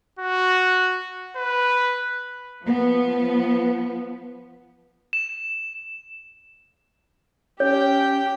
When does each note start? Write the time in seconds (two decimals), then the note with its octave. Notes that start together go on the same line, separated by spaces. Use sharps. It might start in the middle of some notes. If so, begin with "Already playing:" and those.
0.19 F#4
1.37 B4
2.63 F3 B3
5.13 E7
7.60 C#4 G4 C#5 G5